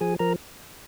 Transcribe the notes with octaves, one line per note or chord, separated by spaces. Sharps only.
F3 G#4 G#5
F3 A#4 A#5